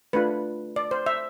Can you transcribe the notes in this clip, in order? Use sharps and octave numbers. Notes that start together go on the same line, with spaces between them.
A3 D4 F4 B4
D5
C5
E5